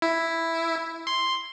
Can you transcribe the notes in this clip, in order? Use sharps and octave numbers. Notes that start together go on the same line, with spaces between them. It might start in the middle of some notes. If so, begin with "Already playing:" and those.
E4
C6